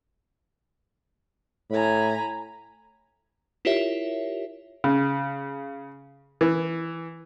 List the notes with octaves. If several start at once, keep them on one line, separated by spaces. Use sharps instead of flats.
A2 G#5 A#5 B5
E4 F4 G4 A#4 C#5 E5
C#3
E3